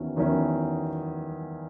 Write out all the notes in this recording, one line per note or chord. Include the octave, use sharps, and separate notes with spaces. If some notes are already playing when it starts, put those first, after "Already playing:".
Already playing: E2 D#3 F#3 C#4 E4
E2 D#3 F#3 C#4 E4